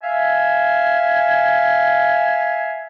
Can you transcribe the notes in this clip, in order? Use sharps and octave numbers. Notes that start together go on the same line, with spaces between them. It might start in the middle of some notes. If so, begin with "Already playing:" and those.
E5 F5 G#5